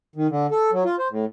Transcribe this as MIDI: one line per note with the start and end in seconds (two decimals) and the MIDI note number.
0.16 0.27 51
0.30 0.47 50
0.51 0.71 69
0.72 0.84 54
0.85 0.96 65
0.99 1.08 72
1.10 1.25 45